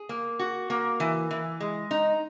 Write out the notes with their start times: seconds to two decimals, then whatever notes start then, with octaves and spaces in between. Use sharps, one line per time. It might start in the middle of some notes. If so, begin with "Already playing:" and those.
Already playing: G#4
0.09 A#3
0.39 F#4
0.70 A#3
1.00 E3
1.31 E3
1.60 G#3
1.91 D#4